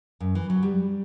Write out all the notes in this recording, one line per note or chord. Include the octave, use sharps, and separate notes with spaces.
F#2
E3
F#3
G3